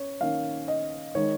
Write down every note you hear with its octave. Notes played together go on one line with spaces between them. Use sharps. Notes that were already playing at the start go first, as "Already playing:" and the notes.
Already playing: C#4 C#5
D#3 A#3 C#4 F5
D#5
D#3 G#3 D#4 C#5